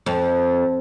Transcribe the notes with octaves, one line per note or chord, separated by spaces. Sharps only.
F2